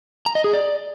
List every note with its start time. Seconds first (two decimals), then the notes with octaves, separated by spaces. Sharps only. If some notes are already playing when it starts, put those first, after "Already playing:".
0.26 A#5
0.35 D#5
0.44 G#4
0.53 D5